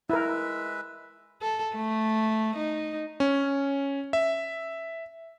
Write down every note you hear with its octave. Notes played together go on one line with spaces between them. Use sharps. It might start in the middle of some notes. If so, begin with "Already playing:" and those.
G#3 E4 A#4 B4 E5
A4
A3
D#4
C#4
E5